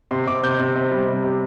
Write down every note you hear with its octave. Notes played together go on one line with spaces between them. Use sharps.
C3 C6
C3 D6
C3 G6
C3
C3
G3
C3
C3